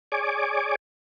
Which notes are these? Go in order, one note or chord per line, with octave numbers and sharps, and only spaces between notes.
G#4 C#5 D5 G#5 D6